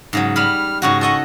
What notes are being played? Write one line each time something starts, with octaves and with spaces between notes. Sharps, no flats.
G#2 C#3 F#3
G3 B5 F6
G#2 C#3 F#4 C#6
A4 D#5 F#5 C#6